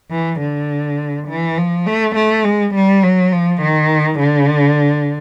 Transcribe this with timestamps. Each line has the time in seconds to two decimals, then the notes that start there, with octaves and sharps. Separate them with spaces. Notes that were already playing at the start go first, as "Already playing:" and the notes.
0.11 E3
0.40 D3
1.28 E3
1.58 F3
1.86 A3
2.16 A3
2.45 G#3
2.75 G3
3.03 F#3
3.32 F3
3.62 D#3
4.20 D3